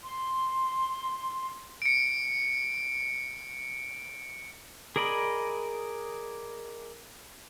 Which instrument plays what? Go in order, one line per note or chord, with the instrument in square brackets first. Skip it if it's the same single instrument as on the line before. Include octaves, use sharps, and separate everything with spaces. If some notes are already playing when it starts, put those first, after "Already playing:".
[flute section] C6
[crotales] C#7 D7
[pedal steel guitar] G#4 A#4 D5 D#5 B5